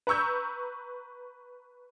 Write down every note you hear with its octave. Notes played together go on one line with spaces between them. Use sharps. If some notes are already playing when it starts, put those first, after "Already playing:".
B4 A#5 C#6 E6 G6